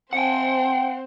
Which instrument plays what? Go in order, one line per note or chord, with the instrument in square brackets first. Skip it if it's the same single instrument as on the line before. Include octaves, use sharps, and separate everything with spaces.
[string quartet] C4 C5 [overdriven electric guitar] F#5 G5